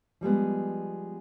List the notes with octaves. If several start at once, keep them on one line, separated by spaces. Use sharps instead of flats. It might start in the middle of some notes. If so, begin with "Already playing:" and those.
F3 G3 G#3 B3